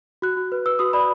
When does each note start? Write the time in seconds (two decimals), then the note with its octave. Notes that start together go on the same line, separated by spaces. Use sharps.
0.22 F#4 F#6
0.37 F#4
0.52 B4
0.66 B4 E6
0.79 F#4 D#6
0.93 D5 B5